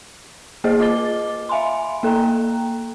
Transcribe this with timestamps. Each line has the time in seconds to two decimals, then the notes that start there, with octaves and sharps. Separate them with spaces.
0.64 A#3 G#4 C5 D#5
0.80 F4 D#5 D6 A6 G7
1.49 E5 F5 G#5 B5 C6
2.03 A#3 A4 G5 A#5